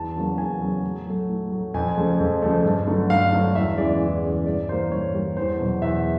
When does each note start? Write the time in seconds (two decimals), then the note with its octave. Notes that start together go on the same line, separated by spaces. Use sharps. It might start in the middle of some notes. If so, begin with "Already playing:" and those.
Already playing: E2 A5
0.16 C#3 F#3 A#3
0.38 E2 G#5
0.61 C#3 F#3 A#3
0.83 A2
1.07 F#3 A3
1.29 A2
1.52 F#3 A3
1.74 F2 G#5
1.97 C#3 F3 A3
2.20 F2
2.42 C#3 F3 A3
2.64 G2
2.87 D3 F#3 A3
3.10 G2 F5
3.33 D3 F#3 A3
3.55 E2 E5
3.78 C#3 E3 G#3 D5
4.01 E2
4.23 C#3 E3 G#3
4.46 G2 D5
4.69 E3 G3 A#3 C5
4.91 G2 C#5
5.14 E3 G3 A#3
5.37 E2 C5
5.59 B2 F#3
5.82 E2 E5